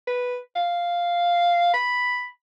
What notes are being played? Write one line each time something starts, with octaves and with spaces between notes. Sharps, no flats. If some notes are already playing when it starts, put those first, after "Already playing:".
B4
F5
B5